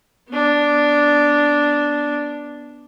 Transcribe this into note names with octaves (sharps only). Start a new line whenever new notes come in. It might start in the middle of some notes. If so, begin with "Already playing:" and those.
B3 D4